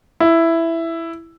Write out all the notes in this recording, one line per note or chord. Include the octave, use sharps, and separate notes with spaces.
E4